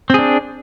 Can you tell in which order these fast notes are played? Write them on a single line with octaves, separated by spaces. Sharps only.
C4 G#4 D4